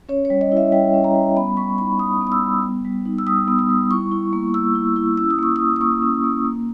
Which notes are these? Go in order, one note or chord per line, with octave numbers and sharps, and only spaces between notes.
C#4 C#5
C#5
G3
D#5
E4 E5
G3 G5
C#4
A#5
G3
B3 B5
G3 C#6
D#4 B5
G3 D#6
B3
D#6
E6
G3
B3
G3
D#4
E6
G3 D#6
B3
D#6
G3
E4 C#6
E4
A#3
A#3 E6
E4
E4
C#4 E6
D#6
A#3 C#6
D#6
E4
D#6
A#3 C#6
C#4
A#3
A#3